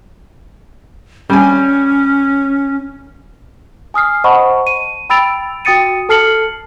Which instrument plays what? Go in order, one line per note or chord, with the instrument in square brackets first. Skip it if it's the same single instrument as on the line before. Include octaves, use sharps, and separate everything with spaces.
[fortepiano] G3 G#5 [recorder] C#4
[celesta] G#5 D#6 F6 C7
C5 D#5 F#5 A5 B5 C#6
D#7
G5 B5 E6 A6 D7 F7
F#4 G5 D#6 A6 C#7 D#7
A4 A5 F6 C7 C#7 F#7